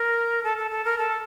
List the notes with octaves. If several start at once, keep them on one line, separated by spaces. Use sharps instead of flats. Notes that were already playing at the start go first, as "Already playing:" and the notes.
Already playing: A#4
A4
A4
A4
A#4
A4